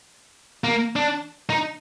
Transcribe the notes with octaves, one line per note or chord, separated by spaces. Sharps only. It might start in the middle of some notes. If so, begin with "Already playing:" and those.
A#3
D4
D#4